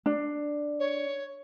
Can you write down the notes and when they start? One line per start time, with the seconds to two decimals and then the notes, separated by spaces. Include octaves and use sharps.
0.06 D4
0.80 C#5